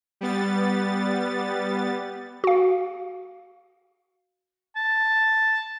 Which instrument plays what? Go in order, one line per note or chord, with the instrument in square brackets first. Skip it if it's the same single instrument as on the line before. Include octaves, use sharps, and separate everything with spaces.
[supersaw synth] G3 B3 A6
[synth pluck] F#4 F5
[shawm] A5